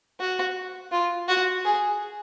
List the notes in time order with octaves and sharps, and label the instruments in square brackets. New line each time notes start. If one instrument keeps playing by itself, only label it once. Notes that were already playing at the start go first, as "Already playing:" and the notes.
[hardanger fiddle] F#4
F4
F#4
G#4